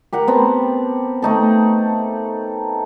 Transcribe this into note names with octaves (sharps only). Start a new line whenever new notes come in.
G4 A#4 F#5
B3 C4 A5
A3 D#4 A4